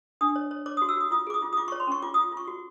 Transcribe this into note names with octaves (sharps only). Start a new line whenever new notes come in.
D4 D#6
C#5
C#5
C#5 D6
D#6
F#4
E6
F#4 D#6
F4 D#6
G#4 D6
D#6
F4
D#6
F4 D6
C#6
C#5
C6
C#4 C#6
F4 D6
D#6
F4
F4 C#6
F#4